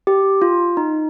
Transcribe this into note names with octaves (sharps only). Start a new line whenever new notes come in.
G4
F4
D#4